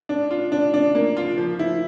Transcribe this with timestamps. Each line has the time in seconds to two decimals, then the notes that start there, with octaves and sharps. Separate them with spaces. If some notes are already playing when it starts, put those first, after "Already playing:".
0.09 D4
0.31 F4
0.52 D4
0.74 D4
0.95 A#3
1.17 F4
1.38 F3
1.59 E4